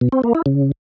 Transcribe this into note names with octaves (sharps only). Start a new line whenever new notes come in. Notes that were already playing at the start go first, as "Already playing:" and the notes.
B2
C4
A#3
E4
C#3